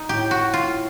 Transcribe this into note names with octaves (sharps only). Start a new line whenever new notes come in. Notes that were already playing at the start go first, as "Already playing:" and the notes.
Already playing: D#4
A2 G4
F#4
F4